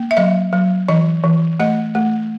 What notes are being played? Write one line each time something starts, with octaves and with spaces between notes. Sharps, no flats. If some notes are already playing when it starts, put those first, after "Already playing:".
Already playing: A#3
E5
F#3 D#5
F#3
E3 D#5
E3
A3 D#5
A3